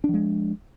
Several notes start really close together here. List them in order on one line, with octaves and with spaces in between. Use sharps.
D4 F3 G#3